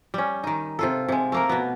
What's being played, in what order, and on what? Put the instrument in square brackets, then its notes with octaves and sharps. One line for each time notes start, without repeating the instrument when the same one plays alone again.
[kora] G3 C#4
D#3 D#4
C3 F4 A4
C3 G#3
A3 A#3 A#4
B2 B3